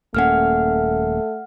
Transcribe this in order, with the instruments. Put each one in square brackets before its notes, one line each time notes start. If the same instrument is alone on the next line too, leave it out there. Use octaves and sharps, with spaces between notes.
[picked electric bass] D#1 A#3 C#4 [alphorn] A3 [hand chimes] F#5 F6